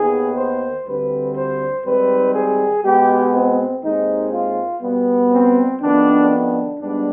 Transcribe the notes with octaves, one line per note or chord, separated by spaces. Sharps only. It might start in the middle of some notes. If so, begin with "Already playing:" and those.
Already playing: D#2 D#3 B3 G#4
C5
D2 D3 G3 C4 B4
C5
G#2 D#3 G3 C4 B4
G#4
B2 G#3 B3 G4
C4
D#2 D#3 G#3 C4 D#4
F4
B2 G3 B3
C4
F2 D#3 B3 D4
D4
G#2 G3 B3 D4